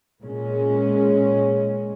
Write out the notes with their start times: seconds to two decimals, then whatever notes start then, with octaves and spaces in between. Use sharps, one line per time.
0.21 A#2 G#3 C#4